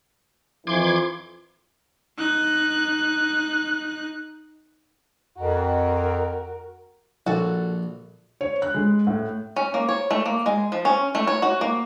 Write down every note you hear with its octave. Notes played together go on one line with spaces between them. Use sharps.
F2 E3 C6 D6 G#6
D#4 F#6
F2 F#4 A#4
A#1 F#4 A4
C#5
F#6
G#3
A2
C#4
A#3
C#5
A3
A#3
G#3
F3
C#4
A3
C#5
F#4
A#3